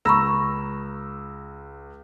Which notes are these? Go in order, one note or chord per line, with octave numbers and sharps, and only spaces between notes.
C#2 A#5 B5 C#6 E6 A#6